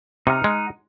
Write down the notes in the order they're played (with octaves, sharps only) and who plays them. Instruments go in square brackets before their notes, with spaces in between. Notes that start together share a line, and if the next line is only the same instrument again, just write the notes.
[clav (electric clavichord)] C3 [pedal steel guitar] D#4 F#5 F6
[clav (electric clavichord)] G#3